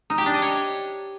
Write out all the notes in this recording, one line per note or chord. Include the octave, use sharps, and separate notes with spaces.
D#4
G4
D4
D#5
C#5